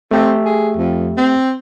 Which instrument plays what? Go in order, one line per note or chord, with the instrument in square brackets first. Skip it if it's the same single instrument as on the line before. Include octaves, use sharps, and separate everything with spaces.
[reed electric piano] A3 G4 E5 [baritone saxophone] C4
[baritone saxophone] G#4
F2
C4